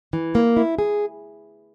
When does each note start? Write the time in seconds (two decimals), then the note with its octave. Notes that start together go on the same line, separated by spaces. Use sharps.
0.13 E3
0.35 A#3
0.57 E4
0.79 G#4